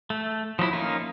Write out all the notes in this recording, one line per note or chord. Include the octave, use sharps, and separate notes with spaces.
A3
F3 F#3 D#4 E4
A#3 C#4 D#4 F4